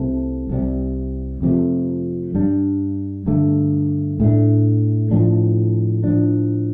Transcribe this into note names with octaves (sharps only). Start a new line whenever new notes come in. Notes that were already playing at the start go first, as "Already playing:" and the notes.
Already playing: C2 C3 A3 C4
C2 C3 G3
F2 C3 F3 A3
G2 G3 D4
G2 D3 A3
A2 A3 D4
A2 F3 A3 D4
A2 F3 D4